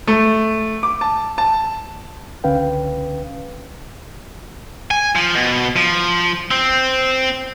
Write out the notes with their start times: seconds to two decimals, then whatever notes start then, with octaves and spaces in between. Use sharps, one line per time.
0.07 A3
0.83 D6
1.01 A5
1.38 A5
2.44 C#2 D3 C#4 B4 F5 G5
4.91 G#5
5.15 F3
5.35 B2
5.76 F3
6.51 C4